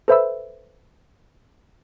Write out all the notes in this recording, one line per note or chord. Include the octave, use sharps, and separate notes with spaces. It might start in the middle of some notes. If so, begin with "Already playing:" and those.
A4 B4 C5 E5 B5 E6